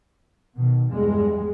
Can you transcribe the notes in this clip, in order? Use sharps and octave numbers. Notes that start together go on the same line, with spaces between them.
B2 D#3
E2 G2 G3 G#3